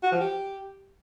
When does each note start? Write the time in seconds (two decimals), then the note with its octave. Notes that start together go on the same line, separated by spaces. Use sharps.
0.03 F#4
0.12 F3
0.20 G4